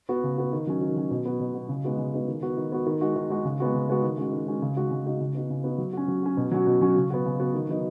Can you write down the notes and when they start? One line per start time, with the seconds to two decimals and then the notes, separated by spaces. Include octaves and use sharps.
0.09 B3 F#4
0.23 C#3
0.38 B3 F#4
0.53 D#3
0.67 F#3 C#4
0.82 D#3
0.97 F#3 C#4
1.11 B2
1.25 B3 F#4
1.40 B2
1.54 B3 F#4
1.69 C#3
1.84 G#3 B3 D#4 F#4
1.98 C#3
2.14 G#3 B3 D#4 F#4
2.28 D#3
2.42 B3 F#4
2.57 D#3
2.72 B3 F#4
2.86 D#3
3.01 G#3 D#4 F#4
3.16 D#3
3.30 G#3 D#4 F#4
3.45 C#3
3.60 G#3 B3 F#4
3.74 C#3
3.89 G#3 B3 F#4
4.03 D#3
4.18 G#3 C#4 F#4
4.32 D#3
4.47 G#3 C#4 F#4
4.62 C#3
4.76 G#3 D#4 F#4
4.91 C#3
5.05 G#3 D#4 F#4
5.20 C#3
5.35 B3 D#4 F#4
5.50 C#3
5.64 B3 D#4 F#4
5.78 F#3
5.93 C#4 F#4
6.08 F#3
6.23 C#4 F#4
6.37 B2
6.52 F#3 C#4 F#4
6.67 B2
6.81 F#3 C#4 F#4
6.95 C#3
7.10 B3 F#4
7.25 C#3
7.40 B3 F#4
7.54 D#3
7.69 F#3 B3 D#4